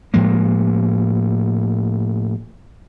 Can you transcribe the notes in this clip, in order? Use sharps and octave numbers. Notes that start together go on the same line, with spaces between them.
A2 F3 G#3 A#3